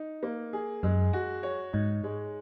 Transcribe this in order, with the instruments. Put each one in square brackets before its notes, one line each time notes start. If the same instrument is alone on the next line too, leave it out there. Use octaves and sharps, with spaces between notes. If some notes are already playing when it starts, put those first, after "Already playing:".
Already playing: [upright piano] D#4
A#3
G#4
[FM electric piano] F#2 [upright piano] G#3
[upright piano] F#4
C#5
[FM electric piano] G#2 [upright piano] D#4
[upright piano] G#3